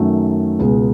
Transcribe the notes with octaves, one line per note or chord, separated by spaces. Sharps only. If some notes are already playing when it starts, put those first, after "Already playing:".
Already playing: F#2 D#3 F#3 A3
C#2 B2 G#3